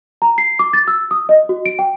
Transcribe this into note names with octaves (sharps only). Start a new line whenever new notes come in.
A#5
C7
D6
A6
E6
D#6
D#5
F#4
D7
G5